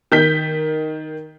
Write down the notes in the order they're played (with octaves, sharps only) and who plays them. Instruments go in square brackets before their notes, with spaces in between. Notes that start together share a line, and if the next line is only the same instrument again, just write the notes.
[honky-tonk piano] D#3 G6 B6